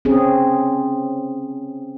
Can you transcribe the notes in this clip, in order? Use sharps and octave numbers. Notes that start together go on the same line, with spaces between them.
C4 C#4 G#4